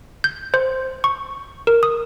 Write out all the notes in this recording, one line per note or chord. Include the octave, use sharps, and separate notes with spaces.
G6
C5
C#6
A#4
D#6